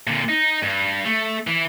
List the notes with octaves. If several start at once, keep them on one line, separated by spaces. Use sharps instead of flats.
A#2 D3
D#4
G2
A3
E3